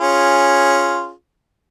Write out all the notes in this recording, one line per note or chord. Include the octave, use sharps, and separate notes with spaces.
C#4 F4 G#4